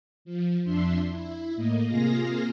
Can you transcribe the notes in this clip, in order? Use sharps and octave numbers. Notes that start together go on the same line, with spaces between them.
F3
F2 D4 E5 C6
E4
A2 A#3 D#5
C3 A#3 F4 G#4 F5 A#6